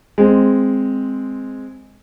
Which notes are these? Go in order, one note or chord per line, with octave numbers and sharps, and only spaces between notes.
G#3 C4